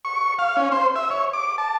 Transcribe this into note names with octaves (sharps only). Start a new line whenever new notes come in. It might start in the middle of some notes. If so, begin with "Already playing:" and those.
C#6
F5
C#4
C5
E5
C#5
D6
A5